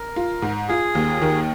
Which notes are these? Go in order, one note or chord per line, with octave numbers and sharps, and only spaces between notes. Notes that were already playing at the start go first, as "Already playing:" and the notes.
Already playing: A#4
F4
G#2
F4 G#4
D#2
D#3